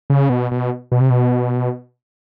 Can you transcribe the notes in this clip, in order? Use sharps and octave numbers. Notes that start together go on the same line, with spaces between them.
C#3
B2
B2
B2
C3
B2